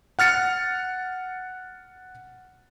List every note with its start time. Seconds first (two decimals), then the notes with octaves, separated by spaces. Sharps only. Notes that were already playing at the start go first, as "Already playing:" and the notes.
0.19 F#5 F6 A6 C#7